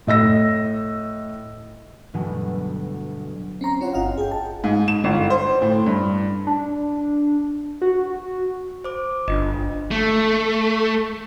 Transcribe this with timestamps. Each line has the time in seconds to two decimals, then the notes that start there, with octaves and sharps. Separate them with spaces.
0.07 A2 D#5 E6 A#6
2.14 G1 D2 G2 B2 E3 F#3
3.61 C4 C#4 A#5 C6
3.81 C#4 E4 F4 C#5 F#5
3.93 G1 F4 D#5 F5 F#5
4.18 G#4 G5
4.31 A5
4.64 G#2
4.88 E7
5.04 G1
5.30 C5
5.62 A2
5.86 G2
6.47 D4
7.82 F#4
8.84 C5 D6
9.28 G1 D4 F4 D#5
9.91 A3